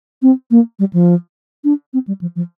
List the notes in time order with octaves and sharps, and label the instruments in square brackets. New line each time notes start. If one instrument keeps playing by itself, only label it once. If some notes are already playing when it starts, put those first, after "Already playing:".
[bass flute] C4
A#3
G3
F3
D4
C4
G3
F3
F3